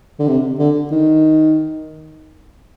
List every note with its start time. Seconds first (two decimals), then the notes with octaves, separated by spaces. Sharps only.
0.19 D3
0.28 C3
0.59 D3
0.91 D#3